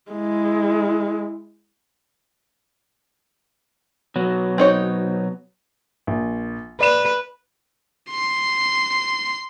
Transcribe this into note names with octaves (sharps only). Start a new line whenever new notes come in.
G#3 E4
B2 F#3
C4 D#4 C#5
A#1
B4 D5 E7
C6